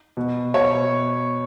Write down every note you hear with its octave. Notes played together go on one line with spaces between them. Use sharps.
B2
B2 C#5